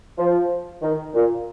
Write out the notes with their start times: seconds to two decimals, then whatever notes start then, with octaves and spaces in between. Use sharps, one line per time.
0.18 F3
0.82 D#3
1.13 A#2